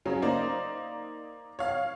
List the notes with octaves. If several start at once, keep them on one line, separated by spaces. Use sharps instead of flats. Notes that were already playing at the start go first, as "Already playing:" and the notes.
C#3 F#3 C#4
A#3 D#4 C5 D5
C#5 F5